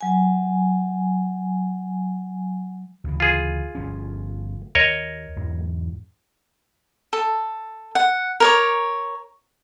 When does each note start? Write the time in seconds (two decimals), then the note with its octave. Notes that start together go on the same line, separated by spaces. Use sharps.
0.01 F#3 G#5
3.04 D2 C#3 E3
3.20 F4 G#4
3.75 G1 F3 C#4
4.75 D#2 A#4 C#5 D#5
5.36 E2 G#2 E3
7.13 A4
7.95 F#5
8.40 A#4 C#5 D6